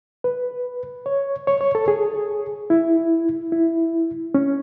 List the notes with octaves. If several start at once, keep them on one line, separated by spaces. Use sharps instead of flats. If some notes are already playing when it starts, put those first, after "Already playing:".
B4
C#5
C#5
C#5
A4
G#4
E4
E4
C#4